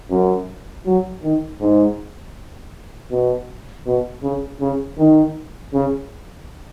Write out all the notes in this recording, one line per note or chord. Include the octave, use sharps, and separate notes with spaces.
F#2
F#3
D#3
G#2
B2
B2
C#3
C#3
D#3
C#3